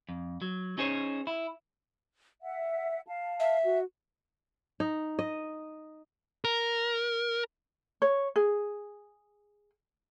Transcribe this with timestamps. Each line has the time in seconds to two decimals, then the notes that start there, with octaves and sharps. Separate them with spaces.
0.09 F2
0.42 F#3
0.78 C#4 D#4 G#4 C5 C#5
1.27 E4
2.42 E5 F#5
3.07 F5 A5
3.40 E5
3.64 F#4
4.80 D#4
5.19 D#5
6.45 A#4
8.02 C#5
8.36 G#4